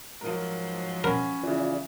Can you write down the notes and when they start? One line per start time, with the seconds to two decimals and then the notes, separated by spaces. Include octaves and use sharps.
0.21 G#2 F3 F#3 A#4
1.04 C#4 A#4 F#5 B5
1.43 C#3 E3 F4 D5